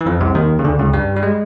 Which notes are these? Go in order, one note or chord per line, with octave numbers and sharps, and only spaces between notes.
E3
F2 F3
C2 C3
D#2 D#3
C#3
D2 D3
C#2 C#3
G2 G3
G3
G#3